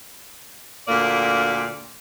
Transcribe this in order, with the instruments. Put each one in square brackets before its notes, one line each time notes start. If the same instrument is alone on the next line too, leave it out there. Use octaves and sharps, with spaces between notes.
[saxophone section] D2 A#2 A#3 D5